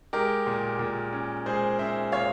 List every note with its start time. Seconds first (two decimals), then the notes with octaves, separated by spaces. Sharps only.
0.13 G#3 G4 A#4
0.47 A#2
0.79 A#2
1.13 C#4
1.46 G#3 G#4 C5
1.79 C#4 C5 E5
2.12 A#2 C#5 F5